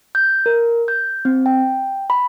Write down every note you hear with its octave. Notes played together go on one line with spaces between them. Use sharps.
G6
A#4
G6
C4
G5
B5